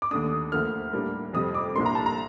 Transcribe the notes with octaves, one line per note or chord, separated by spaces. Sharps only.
D6
D#2 D3 A3 D4 D#6
D2 D3 F3 A#3 F6
A2 G3 A#3 D4
F2 C3 G3 D#6
D6
C2 A#2 G3 A#3 D4 C6
A#5
A5
A#5